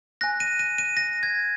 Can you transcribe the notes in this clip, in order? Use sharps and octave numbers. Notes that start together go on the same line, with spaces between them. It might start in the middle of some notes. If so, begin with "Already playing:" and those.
G#5 F#6 A#6
D#7
D#7
D#7
A#6
G#6